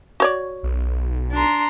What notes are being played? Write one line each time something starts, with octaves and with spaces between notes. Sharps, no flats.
F#4 C#5 D5
B1
D4 A#5 C6